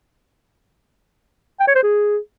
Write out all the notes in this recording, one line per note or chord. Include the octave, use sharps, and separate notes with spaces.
G5
C#5
C5
G#4